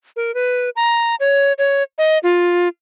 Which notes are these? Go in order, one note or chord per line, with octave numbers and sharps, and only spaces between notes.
A#4
B4
A#5
C#5
C#5
D#5
F4